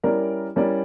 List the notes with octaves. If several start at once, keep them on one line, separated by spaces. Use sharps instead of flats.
G3 C#4 E4 A#4 D5
G3 C#4 E4 A#4 D5